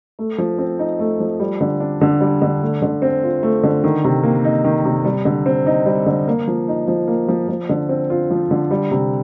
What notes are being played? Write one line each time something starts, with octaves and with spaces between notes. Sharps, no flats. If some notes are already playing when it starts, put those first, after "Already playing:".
A3
F3
C4
D#4
A3
F3
G3
D3
D4
D3
G3
D3
A3
D3
C4
F4
A3
D3
D#3
C3
A#3
D#4
D#3
C3
G3
D3
C4
D#4
G3
D3
A#3
F3
D#4
F3
A#3
F3
F3
D3
C4
F4
F3
D3
G3
C3